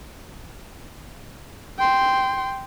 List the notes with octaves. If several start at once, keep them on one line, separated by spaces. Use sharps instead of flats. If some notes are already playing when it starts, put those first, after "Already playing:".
G5 C6